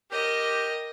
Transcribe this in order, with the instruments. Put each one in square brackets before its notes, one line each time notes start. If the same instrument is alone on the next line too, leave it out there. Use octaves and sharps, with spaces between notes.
[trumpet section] G4 [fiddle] A#4 D#5